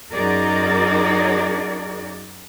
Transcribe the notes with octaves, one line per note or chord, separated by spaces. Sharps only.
F#2 D#4 F#4 G#4 A#4 D5